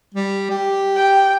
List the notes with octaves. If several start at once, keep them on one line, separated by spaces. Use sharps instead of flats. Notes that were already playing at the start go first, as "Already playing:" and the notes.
G3
G4
G5